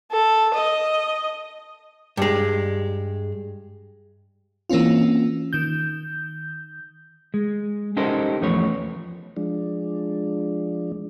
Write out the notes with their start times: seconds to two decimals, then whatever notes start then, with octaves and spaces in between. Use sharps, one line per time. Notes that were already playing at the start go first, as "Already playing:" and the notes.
0.11 A4
0.55 D#5
2.17 G2 G#3
4.70 E3 A#3 C4 C#4 F4
5.53 D#3 G6
7.34 G#3
7.97 C#4 D#4 G4 A4 A#4 C5
8.41 E2 F3 A3 B4 C#5
9.36 F3 G#3 D4